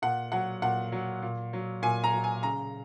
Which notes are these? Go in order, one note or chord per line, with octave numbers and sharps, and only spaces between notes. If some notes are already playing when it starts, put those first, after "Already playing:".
A#2 F#5
F#3 F#5
A#2 F#5
F#3
A#2
F#3
A#2 G#5
A#5
F#3
G#5
C#3 A#5